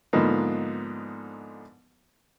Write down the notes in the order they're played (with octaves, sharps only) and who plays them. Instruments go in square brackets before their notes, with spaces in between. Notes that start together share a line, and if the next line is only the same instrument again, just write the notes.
[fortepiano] G#2 D3 F3 A#3 B3 D#4